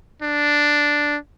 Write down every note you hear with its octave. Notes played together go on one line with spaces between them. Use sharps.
D4